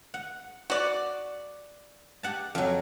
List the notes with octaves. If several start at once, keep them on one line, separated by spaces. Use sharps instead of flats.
F#5
F#4 D5
G4 F#5 A5
F2 F#3